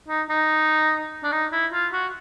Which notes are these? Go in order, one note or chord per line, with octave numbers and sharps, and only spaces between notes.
D#4
D#4
D4
D#4
E4
F4
F#4